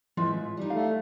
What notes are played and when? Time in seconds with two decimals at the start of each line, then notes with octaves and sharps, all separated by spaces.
0.17 A2 E3 G#3 F4 E5
0.57 G3 D#4
0.70 A3 F5